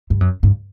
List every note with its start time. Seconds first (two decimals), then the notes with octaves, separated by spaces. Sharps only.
0.10 G2
0.21 F#2
0.43 G2